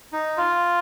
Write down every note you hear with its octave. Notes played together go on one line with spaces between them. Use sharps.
D#4
F4